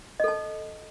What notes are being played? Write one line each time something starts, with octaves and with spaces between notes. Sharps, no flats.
A4 D#5 A5